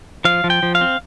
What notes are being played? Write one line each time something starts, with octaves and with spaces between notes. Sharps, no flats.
F3 F5
F3
G5
F3
F5
C4